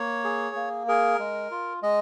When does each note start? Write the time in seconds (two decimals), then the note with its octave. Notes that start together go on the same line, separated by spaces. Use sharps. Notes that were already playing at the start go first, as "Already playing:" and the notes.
Already playing: A#3 C#5
0.24 G#4
0.56 A#3
0.88 G#4 A#4
1.19 G#3
1.51 F4
1.83 G#3 D#5